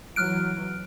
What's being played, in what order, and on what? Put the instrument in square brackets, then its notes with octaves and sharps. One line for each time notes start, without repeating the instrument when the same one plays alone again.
[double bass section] E3 F#3 [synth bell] F6 F#6 D7